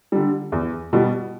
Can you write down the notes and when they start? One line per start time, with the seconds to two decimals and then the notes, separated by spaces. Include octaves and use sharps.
0.12 D3 G3
0.52 E2
0.93 B2 G3